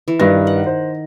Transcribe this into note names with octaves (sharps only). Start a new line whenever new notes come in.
E3
G2 D#3 B4 A#6
F#5
C5